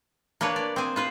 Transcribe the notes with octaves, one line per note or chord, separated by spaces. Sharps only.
A#3 D4 B4 C#5
D5
C4 G#4
F4 B4 C5